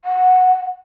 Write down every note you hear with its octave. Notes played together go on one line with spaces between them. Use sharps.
F#5